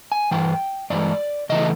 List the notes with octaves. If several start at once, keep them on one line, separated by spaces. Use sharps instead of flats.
G#5
G2 E3 G5
G2 E3 G#3 D5
C#3 E3 A3 D#5